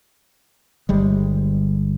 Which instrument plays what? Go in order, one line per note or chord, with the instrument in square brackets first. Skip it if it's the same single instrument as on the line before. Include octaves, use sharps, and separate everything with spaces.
[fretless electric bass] G1 G3 G#3